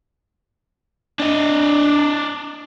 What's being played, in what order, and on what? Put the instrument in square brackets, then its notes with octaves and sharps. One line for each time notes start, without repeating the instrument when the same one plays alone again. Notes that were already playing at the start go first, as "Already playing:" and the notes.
[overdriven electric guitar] D4 D#5